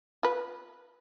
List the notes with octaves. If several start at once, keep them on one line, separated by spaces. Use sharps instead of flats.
F4 B4